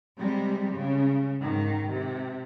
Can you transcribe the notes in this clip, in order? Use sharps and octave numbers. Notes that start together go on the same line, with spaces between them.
C3 G3 G#3
C#3
G#2 D#3
C3